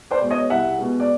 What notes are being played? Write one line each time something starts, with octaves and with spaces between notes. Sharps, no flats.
C5 D5
B2 G#3
C#5 D#5
C2 E5 F#5
B2 G#3
D5